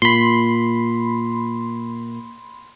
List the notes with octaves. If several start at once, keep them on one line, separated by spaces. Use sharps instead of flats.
A#2 B5 C6